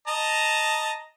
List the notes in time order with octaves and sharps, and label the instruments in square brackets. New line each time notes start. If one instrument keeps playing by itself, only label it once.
[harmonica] D#5 A5 A#5